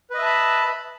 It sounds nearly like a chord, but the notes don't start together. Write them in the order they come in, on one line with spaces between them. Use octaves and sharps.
B4 D#5 E5 A5 B5